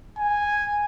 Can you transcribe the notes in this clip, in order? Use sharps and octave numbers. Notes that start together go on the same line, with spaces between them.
G#5